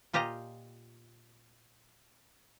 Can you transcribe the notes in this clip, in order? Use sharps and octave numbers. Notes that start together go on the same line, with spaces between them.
A#2 F4 G4 D#5 A#5